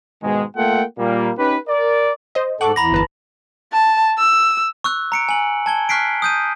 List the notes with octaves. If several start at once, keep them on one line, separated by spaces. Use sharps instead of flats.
G#2 B2 D#3 G#3
A3 A#3 F4 A4 F#5 G5
A#2 G3 A#3
C#4 D#4 G4 B4
A#4 D5
C5 D#5
G#2 A4 F#5 C#6 D6 F#7
E2 A#5 B5 A#6
G1 B4 A5
A5
E6
C#6 E6 F#6
A#5 C#7 D7
G#5 F#7
A5 G#6 G7
C#6 F6 F#6 B6 C7 D7
D#6 G6 D#7